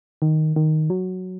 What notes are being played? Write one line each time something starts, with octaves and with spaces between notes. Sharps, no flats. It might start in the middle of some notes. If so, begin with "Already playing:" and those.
D#3
D#3
F#3